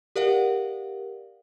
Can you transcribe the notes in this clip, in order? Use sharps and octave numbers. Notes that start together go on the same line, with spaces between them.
G4 A#4 D5 F5 F#5